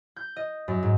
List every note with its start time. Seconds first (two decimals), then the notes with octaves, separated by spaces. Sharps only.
0.16 G6
0.36 D#5
0.68 F#2
0.83 G#2